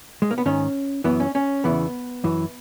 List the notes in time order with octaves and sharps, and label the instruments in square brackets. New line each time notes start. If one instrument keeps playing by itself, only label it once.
[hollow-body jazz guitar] G#3
A#3
B3
G#2 D#3 C#4
F#2 E3 B3
C#4
C#4
E2 C#3 E3 B3
F#2 E3